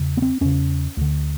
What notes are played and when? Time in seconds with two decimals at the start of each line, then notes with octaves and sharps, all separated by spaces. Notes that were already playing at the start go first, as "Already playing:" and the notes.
Already playing: E2 C#3
0.17 B3
0.22 C4
0.41 E2 C#3 C#4
0.97 D2 D3